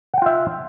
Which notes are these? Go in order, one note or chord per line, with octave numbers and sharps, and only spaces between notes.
F4 E5 F#5 G5